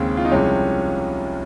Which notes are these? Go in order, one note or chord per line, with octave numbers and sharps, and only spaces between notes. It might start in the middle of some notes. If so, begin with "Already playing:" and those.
Already playing: D#2 C#3 G#3 C4
F4
D#4
C2 C3 F3 G#3 C#4